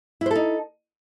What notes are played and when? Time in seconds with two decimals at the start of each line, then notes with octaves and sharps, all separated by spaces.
0.21 E4
0.26 C5
0.31 A4
0.35 D#4